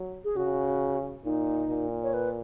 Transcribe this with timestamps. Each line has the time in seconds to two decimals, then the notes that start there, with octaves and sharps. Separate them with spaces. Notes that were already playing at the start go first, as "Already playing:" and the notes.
Already playing: F#3
0.24 G#4
0.36 C#3 F#4
1.24 A#2 D#4
1.69 A#2
2.03 C#5
2.14 B4